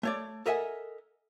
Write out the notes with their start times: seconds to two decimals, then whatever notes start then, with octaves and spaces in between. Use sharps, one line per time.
0.03 A3 C#5 D5
0.46 A4 A#4 D#5 E5 F#5 G#5